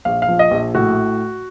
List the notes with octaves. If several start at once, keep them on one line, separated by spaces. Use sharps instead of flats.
A#1 F5
F5
F3
D#5
A#1
A2 F#4